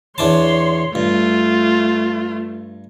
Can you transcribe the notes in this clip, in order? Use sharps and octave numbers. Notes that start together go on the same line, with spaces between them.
E2 D4 C#5 A5 C6
G2 A3 F4